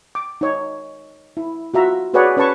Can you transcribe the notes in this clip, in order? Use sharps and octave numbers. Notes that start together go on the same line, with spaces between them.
D6
D#4 C#5
E4
F4 F#4 E5 A#5
F#4 G#4 B4 C#5 D5 F#5
C#4 B4 C#5 A5 C#6